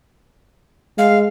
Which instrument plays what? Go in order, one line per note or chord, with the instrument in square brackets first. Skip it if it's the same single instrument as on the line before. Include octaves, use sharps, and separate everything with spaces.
[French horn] G#3 [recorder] F5